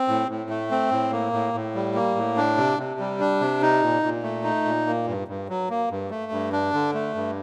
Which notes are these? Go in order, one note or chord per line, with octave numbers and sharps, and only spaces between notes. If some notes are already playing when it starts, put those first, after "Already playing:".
Already playing: C4
A2
A2
A3
C4
A2
A#3
A2
A2
G3
A#3
A2
D4
C3
C3
G3
D4
C3
D#4
A#2
A#2
A3
D#4
A#2
A#3
G2
G2
F#3
A#3
G2
A3
G2
D4
D3
A3
G2